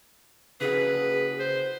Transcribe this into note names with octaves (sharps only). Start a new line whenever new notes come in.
C#3 E4 F#4 G#4 B4
C5